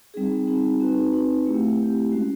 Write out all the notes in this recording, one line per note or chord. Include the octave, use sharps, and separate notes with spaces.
G3 C4 D#4 G#4
G3 C4 D#4 G#4
C4 D#4 F#4 B4
C4 D#4 F#4 B4
A3 C4 E4 G4
A3 C4 E4 G4
G#3 C#4 F#4